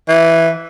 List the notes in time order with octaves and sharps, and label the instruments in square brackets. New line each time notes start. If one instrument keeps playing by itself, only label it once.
[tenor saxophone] E3